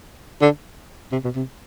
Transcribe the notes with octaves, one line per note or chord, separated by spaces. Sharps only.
D3
C3
B2
C3